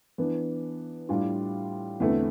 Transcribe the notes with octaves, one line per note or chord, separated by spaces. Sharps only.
E3 B3 D4
A2 G3 D4 F4
E2 D3 A3 C4